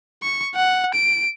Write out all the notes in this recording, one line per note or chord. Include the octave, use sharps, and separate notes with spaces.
C#6
F#5
D7